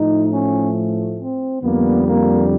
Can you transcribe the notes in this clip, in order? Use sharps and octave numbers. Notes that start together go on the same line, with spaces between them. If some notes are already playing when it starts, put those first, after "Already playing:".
Already playing: A2 F3 A3 D#4
C#4
C4
F2 D3 G3 A#3 B3
A#3